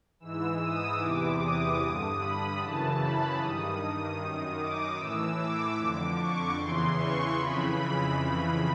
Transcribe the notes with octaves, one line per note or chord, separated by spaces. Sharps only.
G#2 E3 E6
D#6
E2 C3 E3 D6
D#6
G2 D3
B5
F#2 C#3 E3 A5
B5
G2 D#3 D#6
F#2 D#3
D6
A2 E3 E6
D6
F2 D3 D6
C#6
E2 C#3 E3 C6
C#6
F2 C#3 E3 B5
B5
F2 C#3 E3 B5